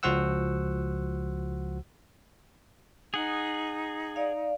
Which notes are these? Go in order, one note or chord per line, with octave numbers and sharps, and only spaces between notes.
C#2 F3 F#4 C5 F#5 E6
D#4 G#4 F#5
D5 F5